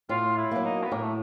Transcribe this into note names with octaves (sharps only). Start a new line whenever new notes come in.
A2 F4
E4
F#3 A#3
D#4
B3
A2 A#3
A3